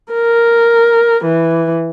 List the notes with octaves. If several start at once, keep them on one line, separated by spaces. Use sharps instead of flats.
A#4
E3